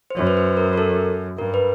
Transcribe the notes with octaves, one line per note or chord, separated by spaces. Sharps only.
C5
F#2 C#5
B4
C5
A#4
A#4
A4
G2 A#4
B4